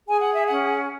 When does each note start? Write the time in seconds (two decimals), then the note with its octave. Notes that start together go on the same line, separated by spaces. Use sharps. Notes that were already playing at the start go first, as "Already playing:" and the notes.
0.07 G#4 G#5
0.20 F#5
0.34 E5
0.47 C#4 F#5